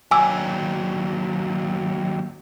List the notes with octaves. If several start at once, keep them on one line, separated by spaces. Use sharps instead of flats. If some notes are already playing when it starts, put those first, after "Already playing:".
D#2 F#3 G#5 D6 E6